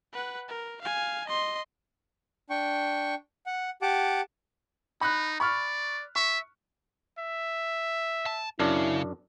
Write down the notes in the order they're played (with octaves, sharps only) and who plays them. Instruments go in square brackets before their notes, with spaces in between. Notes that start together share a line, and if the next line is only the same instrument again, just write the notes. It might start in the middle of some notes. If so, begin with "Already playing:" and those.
[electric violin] B4 F#5
A#4
F5 G#5
D#5 C6
[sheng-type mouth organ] D4 G5 C#6
F#5
G4 F#5 A5 D6
[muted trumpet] D#4 [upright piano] B5 F#6
[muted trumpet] D5 [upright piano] B5 C#6 F6
[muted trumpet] E5 [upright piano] C#6
[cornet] E5
[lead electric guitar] A5
[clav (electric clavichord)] F#2 D4 [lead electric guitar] C#3 [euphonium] E4